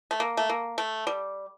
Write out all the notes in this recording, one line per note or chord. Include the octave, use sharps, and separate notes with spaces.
A3
A#3
A3
A#3
A3
G3